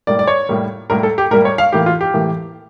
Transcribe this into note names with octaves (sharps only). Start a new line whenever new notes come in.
A2 G3 A#3 D5
D5
C#5
A2 G3 A#3
A2 G3 A#3 A#4
A4
G4
A2 G3 A#3 A#4
C#5
F5
A2 E3 A#3 G4
F4
G4
A2 E3 A#3